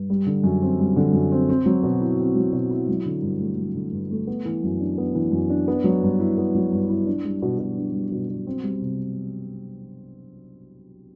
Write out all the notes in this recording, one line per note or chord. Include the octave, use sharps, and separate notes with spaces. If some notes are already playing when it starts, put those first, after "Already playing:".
Already playing: G2
G3
D3
F#2
C4
G3
D3
F#2
C4
C4
F#3
B2
E4
C4
F#3
B2
E4
F#3
D3
G2
A3
F#3
D3
G2
A3
B3
E3
F#2
D4
B3
E3
F#2
D4
B3
F#3
G2
E4
B3
F#3
G2
E4
D4
G3
B2
B2
D4
G3
B2
B2
C4
G3
C3